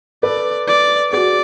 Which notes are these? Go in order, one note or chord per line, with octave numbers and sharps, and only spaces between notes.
A4 B4 D5
D5
F#4 G#4 D5